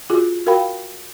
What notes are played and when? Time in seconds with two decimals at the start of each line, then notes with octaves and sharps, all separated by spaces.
0.10 F4 F#4 G#4
0.46 F#4 A#4 F5 G5 B5